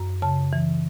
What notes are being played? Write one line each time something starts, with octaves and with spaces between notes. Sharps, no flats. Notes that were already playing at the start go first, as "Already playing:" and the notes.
Already playing: F#2
C#3 A5
E3